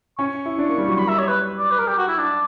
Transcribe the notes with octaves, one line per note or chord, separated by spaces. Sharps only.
C#4 C#6
E4
D4
A#3
G3
F#3 C#6
G3 B5
E5
C#5
B4
D5
B4
A#4
G4
F#4
E4
D4